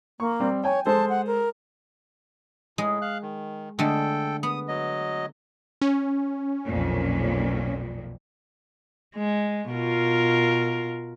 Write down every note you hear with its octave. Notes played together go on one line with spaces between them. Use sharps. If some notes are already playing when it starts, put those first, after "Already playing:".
A#3 C#6
G3 C4
C#5 G5 G#5
G#3 A4 C5 A5
F#5
A#4
A2 G#3 G#4
F5 F#6
D#3
D3 G#3 A3 A4 G5
B3 D#6
F#3 D#5
C#4
B1 F2 A#2
G#3
B2 F4 A#4